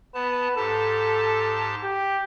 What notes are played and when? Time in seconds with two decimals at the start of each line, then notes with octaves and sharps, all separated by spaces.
0.15 B3 B4 A5
0.56 G#2 G4 A4 A5
1.83 G4